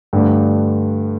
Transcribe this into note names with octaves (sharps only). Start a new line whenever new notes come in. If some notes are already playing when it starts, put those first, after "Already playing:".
G2 D3 A3